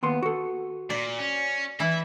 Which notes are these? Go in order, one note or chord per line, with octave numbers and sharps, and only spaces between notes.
D#2 B3 C6
F#4 A4
A#2 D5
C#4
E3 E4 E5